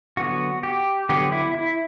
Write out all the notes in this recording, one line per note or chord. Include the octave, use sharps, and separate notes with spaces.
D3 F#3 B3 F#4
G4
D3 F#3 B3 G4
E4
E4